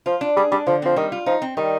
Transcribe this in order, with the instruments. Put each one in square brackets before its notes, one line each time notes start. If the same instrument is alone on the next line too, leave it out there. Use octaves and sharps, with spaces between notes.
[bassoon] F3 [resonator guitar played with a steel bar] F4
[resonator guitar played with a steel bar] D4
[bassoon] G3 [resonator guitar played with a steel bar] G#4
[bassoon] G3 [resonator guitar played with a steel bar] D4
[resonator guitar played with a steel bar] D3 [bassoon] F3
[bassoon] F3 [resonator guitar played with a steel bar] C4
[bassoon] D#3 [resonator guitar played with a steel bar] G3
[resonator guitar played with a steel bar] F4
[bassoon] F3 [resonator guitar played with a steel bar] D#4
[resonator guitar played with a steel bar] C4
[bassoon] D#3 [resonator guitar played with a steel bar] G3